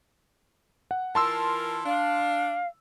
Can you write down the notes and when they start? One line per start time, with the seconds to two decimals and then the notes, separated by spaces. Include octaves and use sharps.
0.91 F#5
1.15 E3 F4 A#4 A5 C6 E6
1.86 D4 F5